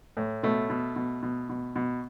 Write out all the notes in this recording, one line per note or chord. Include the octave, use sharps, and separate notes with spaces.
A2
B2 A3
B2
B2
B2
B2
B2